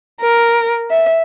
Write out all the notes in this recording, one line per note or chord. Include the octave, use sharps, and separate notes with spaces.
A#4
E5